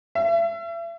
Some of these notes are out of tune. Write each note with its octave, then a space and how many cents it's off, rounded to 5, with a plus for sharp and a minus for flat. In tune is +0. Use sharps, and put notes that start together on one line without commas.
E5 +35